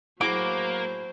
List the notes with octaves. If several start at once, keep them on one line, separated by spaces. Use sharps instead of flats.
A2 F#3 A#3 F#4 G#4 C5 D6